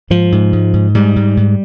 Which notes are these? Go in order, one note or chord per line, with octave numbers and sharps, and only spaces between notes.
G#2 F3
G#2
G#2
G#2
G#2 G3
G#2
G#2